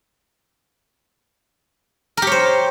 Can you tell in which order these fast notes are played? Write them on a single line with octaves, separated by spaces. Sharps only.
A#4 G4 C#5 C5